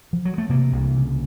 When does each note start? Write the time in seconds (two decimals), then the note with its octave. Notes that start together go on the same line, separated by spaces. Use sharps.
0.13 F3
0.25 F#3
0.38 A3
0.49 C3 A#3
0.72 C2
0.96 C#3